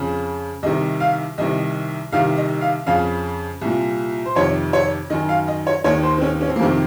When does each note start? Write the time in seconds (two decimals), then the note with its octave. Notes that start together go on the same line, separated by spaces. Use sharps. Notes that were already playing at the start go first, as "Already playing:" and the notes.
Already playing: F2 C#3
0.63 C2 C3 D#3 D#5
1.00 F5
1.38 C2 C3 D#3 D#5
2.12 C2 C3 D#3 F5
2.37 D#5
2.61 F5
2.87 F2 C#3 F5
3.61 C2 A#2
4.26 C5
4.36 F2 C3 D#3 C#5
4.73 C#5
5.10 F#2 D#3 D#5
5.29 F5
5.48 D#5
5.67 C#5
5.84 D#2 D#3 C#5
6.03 C5
6.18 C4
6.22 C#4
6.41 C#4
6.48 C4
6.56 A#3
6.59 F2 C3 D#3 C4